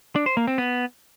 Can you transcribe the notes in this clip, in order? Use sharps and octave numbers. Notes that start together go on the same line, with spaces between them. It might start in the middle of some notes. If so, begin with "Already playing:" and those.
D4
C5
A#3
C4
B3